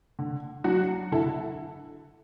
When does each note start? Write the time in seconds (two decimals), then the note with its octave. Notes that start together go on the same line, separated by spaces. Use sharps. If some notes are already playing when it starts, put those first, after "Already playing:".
0.19 D3
0.64 F#3 D4 F#4
1.12 D3 E4 A4